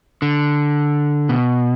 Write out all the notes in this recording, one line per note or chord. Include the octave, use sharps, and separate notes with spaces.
D3
B2